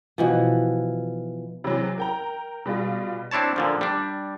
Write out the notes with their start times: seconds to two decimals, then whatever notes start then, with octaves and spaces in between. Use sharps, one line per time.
0.18 B2 E3 F3
1.64 C3 E3 F#3 G#3
1.98 A#4 G5 A#5
2.65 B2 G3 G#3 F4
3.31 C4 D4 E4 C#5 A5
3.56 A#2 D3 F3
3.81 G3 D4